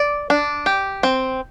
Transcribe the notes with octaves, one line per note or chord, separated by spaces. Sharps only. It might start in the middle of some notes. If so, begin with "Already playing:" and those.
Already playing: D5
D4
G4
C4